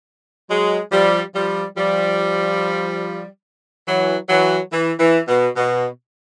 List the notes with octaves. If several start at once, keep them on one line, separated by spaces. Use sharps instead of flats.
F#3 G#3
F3 G3
F3 G3
F3 G3
E3 F#3
E3 F#3
E3
E3
B2
B2